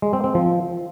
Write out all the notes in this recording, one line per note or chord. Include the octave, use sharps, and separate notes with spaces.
G#3
C4
C4
F3